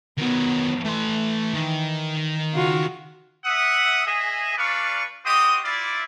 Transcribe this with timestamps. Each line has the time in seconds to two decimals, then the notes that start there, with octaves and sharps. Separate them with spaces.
0.18 D#3 F#3 B3
0.85 E3 A3 C6
1.54 D#3
2.54 C#3 F4 F#4
3.45 E5 F#5 D#6
4.06 G#4 D#5 E5
4.57 G3 D4 B4 D5 F5 C#6
5.24 C4 F#4 G4 C5 D#5 D#6
5.64 E4 F4 D5